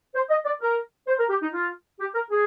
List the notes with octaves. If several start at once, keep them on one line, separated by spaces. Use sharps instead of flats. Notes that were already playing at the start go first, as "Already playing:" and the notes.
C5
D#5
D5
A#4
C5
A#4
G4
D#4
F4
G4
A#4
G#4